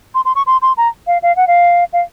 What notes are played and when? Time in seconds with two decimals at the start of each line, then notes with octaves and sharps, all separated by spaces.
0.14 C6
0.25 C6
0.35 C#6
0.46 C6
0.62 C6
0.77 A#5
1.07 F5
1.23 F5
1.36 F#5
1.47 F5
1.93 F5